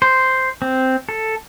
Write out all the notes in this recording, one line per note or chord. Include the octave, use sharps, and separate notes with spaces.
C5
C4
A4